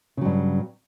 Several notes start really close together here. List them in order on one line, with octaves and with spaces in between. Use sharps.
C#3 F#3 G2